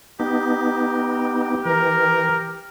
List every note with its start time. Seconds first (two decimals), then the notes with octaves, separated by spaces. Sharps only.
0.20 B3 D#4 G4
1.65 E3 A#4